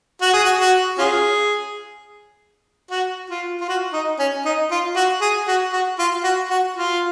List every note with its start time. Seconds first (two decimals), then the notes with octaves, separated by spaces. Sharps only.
0.22 F#4
0.33 G#4
0.45 F#4
0.60 F#4
0.98 C#4 F4 G#4
2.90 F#4
3.30 F4
3.60 F4
3.68 F#4
3.93 D#4
4.19 C#4
4.45 D#4
4.71 F4
4.96 F#4
5.21 G#4
5.48 F#4
5.72 F#4
5.99 F4
6.24 F#4
6.50 F#4
6.76 F4